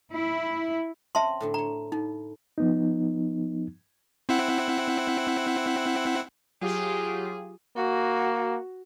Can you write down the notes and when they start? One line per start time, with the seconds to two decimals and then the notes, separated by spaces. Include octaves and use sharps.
0.13 E4
1.15 C4 C#4 E5 A5 C6
1.40 A2 D3 D4
1.54 C#5 A#5 C6
1.92 A2 D#4
2.58 F3 B3 D#4
4.29 C4 E4 F#5
6.61 F#3 F4 G4 G#4
7.76 A#3 F#4